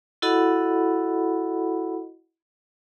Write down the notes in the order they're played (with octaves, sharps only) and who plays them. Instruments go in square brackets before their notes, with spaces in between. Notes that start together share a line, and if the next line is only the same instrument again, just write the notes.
[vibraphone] E4 F#4 A4 D#5 F#5 B5